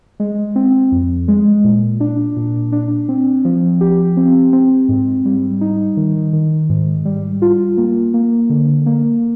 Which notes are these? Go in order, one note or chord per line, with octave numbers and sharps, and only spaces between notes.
G#3
C4
F2
G#3
A#2
D4
A#2
D4
C4
F3
G4
C4
C4
G#2
G3
D#4
D#3
D#3
G#2
G3
F4
A#3
A#3
D3
A#3